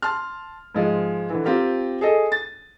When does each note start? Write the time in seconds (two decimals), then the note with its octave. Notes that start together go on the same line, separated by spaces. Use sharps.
0.02 A5 C6 F6
0.75 G#2 F3 G#3
1.30 D3 E3
1.45 C4 F4 G4 A#4
2.01 G#4 A4 D#5
2.32 A6